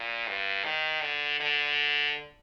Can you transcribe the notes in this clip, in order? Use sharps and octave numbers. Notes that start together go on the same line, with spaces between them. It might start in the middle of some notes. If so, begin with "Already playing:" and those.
Already playing: A#2
G2
D#3
D3
D3